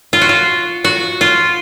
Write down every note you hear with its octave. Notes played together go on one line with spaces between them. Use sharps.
F4
F#4
F4
F#4
F4